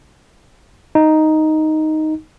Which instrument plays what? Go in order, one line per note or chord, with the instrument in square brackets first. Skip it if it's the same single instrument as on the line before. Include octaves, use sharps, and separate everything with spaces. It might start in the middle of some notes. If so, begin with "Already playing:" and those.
[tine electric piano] D#4